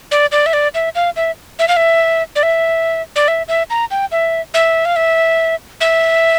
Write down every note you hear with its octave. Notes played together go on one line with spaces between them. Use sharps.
D5
D5
E5
D5
E5
F5
E5
E5
F5
E5
D5
E5
D5
E5
E5
A#5
G5
E5
E5
F5
E5
E5